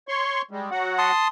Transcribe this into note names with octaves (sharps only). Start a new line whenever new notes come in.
C#5 C6 C#6
G3 G#3
F#3 F#4 F#5
A5 C6 D#6